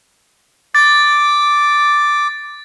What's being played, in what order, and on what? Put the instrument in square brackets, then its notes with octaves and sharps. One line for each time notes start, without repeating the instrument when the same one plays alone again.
[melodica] D6 [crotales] A6